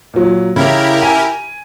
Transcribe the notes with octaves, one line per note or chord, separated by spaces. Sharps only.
A#2 F#3
C#3 E4 G4 A#4
G#5